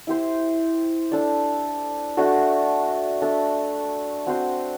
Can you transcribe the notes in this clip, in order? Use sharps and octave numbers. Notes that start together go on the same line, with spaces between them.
E4 G4 C5
D4 A4 D5
A3 D4 F#4 A4
D4 A4 E5
C4 F#4 C5